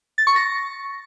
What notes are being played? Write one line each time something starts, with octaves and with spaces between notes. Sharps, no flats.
A6
C#6
A#6